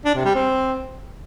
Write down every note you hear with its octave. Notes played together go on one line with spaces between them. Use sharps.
D4
C3
G3
C4